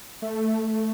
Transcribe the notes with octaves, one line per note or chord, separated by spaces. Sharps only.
A3